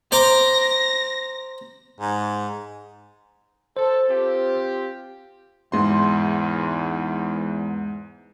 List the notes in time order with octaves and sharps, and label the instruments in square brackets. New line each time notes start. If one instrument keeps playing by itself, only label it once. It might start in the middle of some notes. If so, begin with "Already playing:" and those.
[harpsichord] C5 A#5 D6 [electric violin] A#6
[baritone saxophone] G#2
[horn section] A4 [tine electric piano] C5
[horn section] C4 F4 G4
[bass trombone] E2 [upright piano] G#2 C6